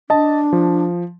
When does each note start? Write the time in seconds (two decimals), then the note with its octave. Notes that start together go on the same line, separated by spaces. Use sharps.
0.10 D4 D#5 A5
0.53 F3